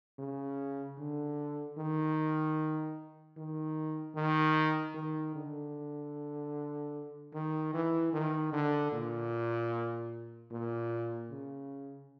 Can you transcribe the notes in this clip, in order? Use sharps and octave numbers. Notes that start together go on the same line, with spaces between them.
C#3
D3
D#3
D#3
D#3
D#3
D3
D#3
E3
D#3
D3
A#2
A#2
C#3